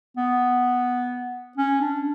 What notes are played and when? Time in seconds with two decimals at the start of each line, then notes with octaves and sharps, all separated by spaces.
0.17 B3
1.58 C#4
1.81 D4